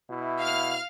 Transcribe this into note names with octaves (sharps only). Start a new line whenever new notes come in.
B2 E4
F5 F6